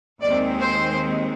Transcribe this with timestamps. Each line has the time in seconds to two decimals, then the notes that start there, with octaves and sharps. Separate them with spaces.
0.22 D#2 D#3 G#3 C4 D5
0.60 C5